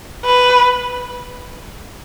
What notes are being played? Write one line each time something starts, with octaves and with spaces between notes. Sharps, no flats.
B4